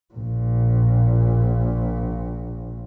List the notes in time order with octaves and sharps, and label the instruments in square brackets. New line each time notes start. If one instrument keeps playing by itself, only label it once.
[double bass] A#1 A#2